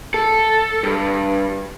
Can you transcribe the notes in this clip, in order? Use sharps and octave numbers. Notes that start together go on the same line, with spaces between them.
A4
G2